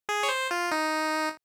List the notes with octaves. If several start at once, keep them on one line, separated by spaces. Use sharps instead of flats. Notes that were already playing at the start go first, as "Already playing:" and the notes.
G#4
C#5
C5
F4
D#4